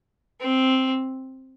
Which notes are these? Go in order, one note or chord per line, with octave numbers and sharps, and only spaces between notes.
C4